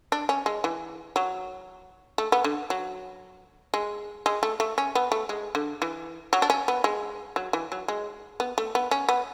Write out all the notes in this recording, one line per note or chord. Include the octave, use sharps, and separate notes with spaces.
D4
C#4
G#3
E3
F#3
A3
B3
D3
F#3
G#3
G#3
A3
A3
C#4
B3
A3
G#3
D3
E3
F#3
D4
C#4
B3
G#3
F#3
E3
F#3
G#3
B3
A3
B3
C#4
B3